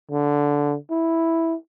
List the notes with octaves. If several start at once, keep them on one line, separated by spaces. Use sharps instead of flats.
D3
E4